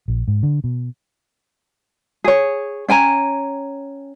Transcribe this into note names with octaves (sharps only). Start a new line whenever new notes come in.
A#1
G#2
D3
B2
G#4 C#5
C#4 G5 G#5 A#5